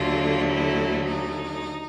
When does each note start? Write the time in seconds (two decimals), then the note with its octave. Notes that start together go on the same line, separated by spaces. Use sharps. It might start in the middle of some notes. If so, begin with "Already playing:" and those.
Already playing: D#2 D3 F#3 A3 F4
0.54 E4
1.08 D#4